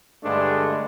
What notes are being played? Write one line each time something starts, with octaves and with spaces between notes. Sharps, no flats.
G2 D3 G#3 A3 D4